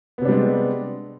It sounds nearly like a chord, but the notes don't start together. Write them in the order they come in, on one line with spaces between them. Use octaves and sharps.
B3 C3 D4 G3 G#3